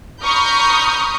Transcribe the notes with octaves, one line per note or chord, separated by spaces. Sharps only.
A#5 B5 C#6 D#6 F6 G6